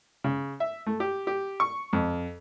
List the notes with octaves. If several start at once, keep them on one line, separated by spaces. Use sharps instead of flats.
C#3
E5
A3
G4
G4
C#6
F2